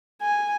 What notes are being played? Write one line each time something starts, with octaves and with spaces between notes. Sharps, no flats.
G#5